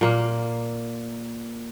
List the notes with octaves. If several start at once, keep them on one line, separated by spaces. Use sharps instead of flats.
A#2 A#3